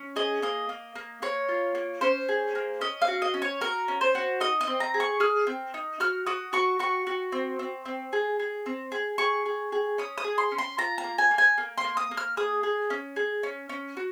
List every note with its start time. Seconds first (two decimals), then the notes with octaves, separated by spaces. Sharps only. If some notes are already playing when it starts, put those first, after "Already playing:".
Already playing: C#4
0.16 G#4 D#5
0.42 A#3 D#5
0.69 A#3
0.95 A#3
1.22 A#3 C#5
1.49 F4
1.75 A#3
2.01 C#4 C5
2.29 G#4
2.55 A#3
2.81 C#4 D#5
3.02 F5
3.08 F#4
3.22 D#5
3.34 C#4
3.42 C#5
3.61 F#4 A#4
3.88 C#4
4.01 C5
4.15 F#4
4.40 D#4 D#5
4.61 D#5
4.67 C4
4.80 A#5
4.94 G#4
5.00 C#6
5.20 G#4 F6
5.47 C4
5.74 D#4
6.00 F#4 F6
6.27 F#4 D#6
6.53 F#4 C#6
6.79 F#4 C#6
7.07 F#4
7.32 C4
7.59 C4
7.85 C4
8.13 G#4
8.40 G#4
8.66 C4
8.92 G#4
9.18 G#4 C#6
9.46 G#4
9.72 G#4
9.98 C#4 D#6
10.18 D#6
10.24 G#4
10.38 C6
10.51 C#4
10.58 C6
10.78 F4 A#5
10.98 A#5
11.04 A#3
11.18 G#5
11.31 A#3
11.38 G#5
11.58 A#3
11.78 C6
11.84 A#3
11.97 D#6
12.11 A#3
12.17 F6
12.37 G#4 D#6
12.63 G#4
12.90 C#4
13.16 G#4
13.43 C#4
13.69 C#4
13.97 F#4